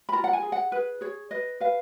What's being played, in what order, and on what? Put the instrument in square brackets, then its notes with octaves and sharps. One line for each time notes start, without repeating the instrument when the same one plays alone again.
[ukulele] B5
F4 A#5
F#5
G#5
G#4
F#5
G#4 B4
G#4 C#5
B4 D#5
B4 F5